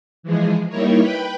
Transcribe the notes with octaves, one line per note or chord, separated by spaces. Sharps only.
E3 F3 G#3 G#4
G3 A#3 D#4 E4 A#4 C#5
B4 G5 B5